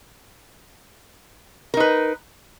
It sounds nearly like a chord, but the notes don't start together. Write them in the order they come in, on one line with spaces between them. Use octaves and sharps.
A#4 D#4 B4